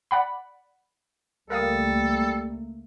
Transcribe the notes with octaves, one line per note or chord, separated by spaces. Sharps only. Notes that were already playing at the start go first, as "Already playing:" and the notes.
D5 F#5 B5
C#2 G3 A3 A#3 A4 A#4 F5 D#6